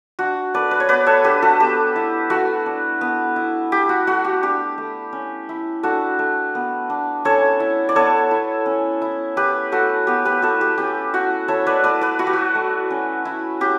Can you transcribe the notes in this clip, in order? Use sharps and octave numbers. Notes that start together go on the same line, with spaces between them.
D4 F#4
A3 B4 D5
B4
C#5
B3 B4 D5
A4 C#5
D4 G4 B4
F#4 A4
B3 G4
E4
A3 F#4
D4
B3
E4
E4 G4
F#4
A3 F#4
G4
D4 G4
A3
C#4
E4
D4 F#4 A4
A3
B3
D4
C#4 A4 C#5
E4
D5
B3 A4 C#5
E4
C#4
E4
E4 G4 B4
A3 F#4 A4
B3 G4
G4 B4
E4 F#4 A4
G4
C#4 G4
E4 F#4
E4 A4 C#5
B4 D5
A3 B4 D5
B4 D5
E4 F#4
G4
F#4
A3
C#4
E4
C#4 G4